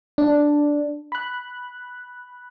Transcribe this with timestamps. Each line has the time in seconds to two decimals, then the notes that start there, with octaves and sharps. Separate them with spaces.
0.18 D4
1.12 B5 F#6